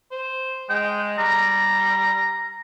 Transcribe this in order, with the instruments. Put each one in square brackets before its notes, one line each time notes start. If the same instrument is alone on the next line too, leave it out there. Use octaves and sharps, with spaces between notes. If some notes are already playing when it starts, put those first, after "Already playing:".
[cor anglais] C5
[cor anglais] G#3 [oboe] G5
[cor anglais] G3 [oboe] A#5